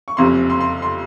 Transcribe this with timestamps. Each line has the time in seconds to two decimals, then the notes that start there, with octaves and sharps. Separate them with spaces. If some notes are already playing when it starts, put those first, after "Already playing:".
0.08 C#6
0.17 F#1 F2 C3 C6
0.50 C6
0.61 C6
0.82 C6